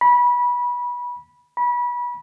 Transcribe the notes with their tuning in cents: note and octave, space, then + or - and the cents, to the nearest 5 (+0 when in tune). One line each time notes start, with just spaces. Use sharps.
B5 -25
B5 -30